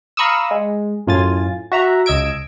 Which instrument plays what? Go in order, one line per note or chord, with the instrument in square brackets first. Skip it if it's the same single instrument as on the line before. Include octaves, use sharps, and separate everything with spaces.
[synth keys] F5 A#5 B5 C#6 D#6 E6
G#3
F#2 A2 F4 G#5 A6
F#4 E5 A#5
C#2 D#5 E6 G#6 D7